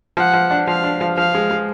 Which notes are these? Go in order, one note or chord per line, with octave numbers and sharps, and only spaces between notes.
F3 F#5
F3
D4
F3 F5
D4
F3
F3 F5
G#3
G#3